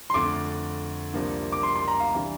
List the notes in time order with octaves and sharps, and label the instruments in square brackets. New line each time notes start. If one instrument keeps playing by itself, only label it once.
[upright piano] C6
[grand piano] F2 D3 A3 [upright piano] D6
[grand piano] C2 C3 F3 A#3 D4
[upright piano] D6
C6
C6
A#5
F5
[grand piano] C3 E3 G3 D4